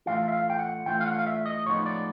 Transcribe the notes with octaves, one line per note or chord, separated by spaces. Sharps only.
A2 E3 A3 D4 F4 F5
E5
F5
G5
F#5
A2 E3 A3 D4 F4 G5
F5
F#5
F5
E5
D#5
A2 F3 G#3 B3 D#4 C#5
D5